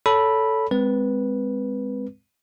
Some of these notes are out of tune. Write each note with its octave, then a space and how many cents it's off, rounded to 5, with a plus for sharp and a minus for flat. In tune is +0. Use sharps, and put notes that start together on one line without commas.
A4 +0 C#5 +25 B5 -10
G#3 -15 C4 -20 B4 -15